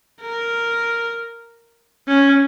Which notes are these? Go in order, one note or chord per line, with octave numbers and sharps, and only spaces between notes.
A#4
C#4